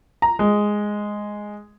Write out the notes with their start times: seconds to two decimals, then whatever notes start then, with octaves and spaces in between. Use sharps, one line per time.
0.22 A#5
0.39 G#3